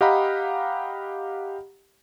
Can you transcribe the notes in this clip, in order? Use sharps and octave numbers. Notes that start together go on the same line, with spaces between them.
G4 D#5 F5 F#5 A#5 B5